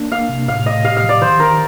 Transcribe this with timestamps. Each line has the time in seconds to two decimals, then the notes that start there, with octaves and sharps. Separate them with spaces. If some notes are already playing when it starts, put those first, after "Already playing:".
Already playing: A#3 D4
0.12 A#3 F5
0.29 C3
0.48 A2 F5
0.66 A2 D#5
0.85 G4 F5
0.97 F5
1.04 F3
1.09 D5
1.21 D#3 C5
1.40 D#3 A#4